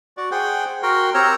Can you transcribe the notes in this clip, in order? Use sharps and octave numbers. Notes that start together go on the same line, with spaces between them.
F#4 D5
G#4 C5 F#5 G5
F#4 A#4 G5 C6
C4 G4 A#4 C#5 A#5 E6